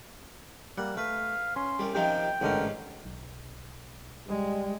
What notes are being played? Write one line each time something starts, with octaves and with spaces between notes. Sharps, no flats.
G3 A#3 F#5
A3 B4 F5
C#4 C6
C2 G3
C3 D#3 F3 G5
A1 G#2 D3 C#4 A#4
B1
G3 G#3